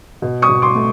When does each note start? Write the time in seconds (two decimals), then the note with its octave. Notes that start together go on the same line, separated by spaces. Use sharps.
0.22 B2
0.42 C#6 D#6
0.49 B2
0.62 C6 D6
0.75 A3